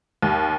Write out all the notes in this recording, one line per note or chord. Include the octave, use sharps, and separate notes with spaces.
D#2